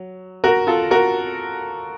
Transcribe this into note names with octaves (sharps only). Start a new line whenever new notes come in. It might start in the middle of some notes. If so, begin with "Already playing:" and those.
Already playing: F#3
F#4 A#4
F4 A4
F#4 A#4